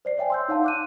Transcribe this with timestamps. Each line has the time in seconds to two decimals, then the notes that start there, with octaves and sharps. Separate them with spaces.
0.05 C5 D5 C7
0.18 C#5 E5 G5 G#5
0.30 C6 E6 G6
0.49 D#4 C#5 F5 F#5 A5 C6
0.64 D6 F#6 D#7